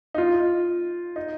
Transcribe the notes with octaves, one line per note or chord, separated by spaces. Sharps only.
D#4
F4
D#4